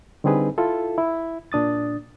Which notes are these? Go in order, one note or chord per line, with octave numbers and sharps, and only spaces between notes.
D3 G3 C4 D#4 G#4 B4
E4 F4 A4
E4
A#2 D4 D#6 A6